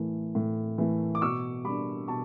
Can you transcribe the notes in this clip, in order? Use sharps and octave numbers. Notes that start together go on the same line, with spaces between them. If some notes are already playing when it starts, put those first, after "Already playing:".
Already playing: A2 E3 A3
A2
E3 A3
D6
B2 C#6 E6
G3 D4 B5 D6
B2 A5 C#6